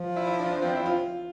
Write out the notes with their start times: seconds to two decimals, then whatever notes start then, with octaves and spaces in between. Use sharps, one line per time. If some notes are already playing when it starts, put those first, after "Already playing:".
Already playing: F3
0.16 E4
0.27 E4
0.39 D4
0.51 D4
0.62 C4
0.74 E4
0.86 F4